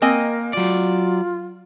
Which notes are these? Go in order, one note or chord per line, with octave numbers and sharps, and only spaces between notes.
A#3 C4 A#4 D#5 G#5
F#3 F4 D5